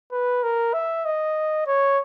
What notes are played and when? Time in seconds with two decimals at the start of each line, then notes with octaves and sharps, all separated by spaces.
0.12 B4
0.43 A#4
0.74 E5
1.06 D#5
1.67 C#5